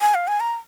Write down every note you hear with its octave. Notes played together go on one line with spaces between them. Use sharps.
G#5
F5
G#5
A#5